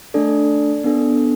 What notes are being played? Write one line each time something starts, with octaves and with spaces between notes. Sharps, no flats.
A3 D4 A4 D5
B3 D4 A4